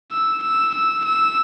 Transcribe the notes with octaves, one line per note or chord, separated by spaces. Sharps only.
E6
E6
E6
E6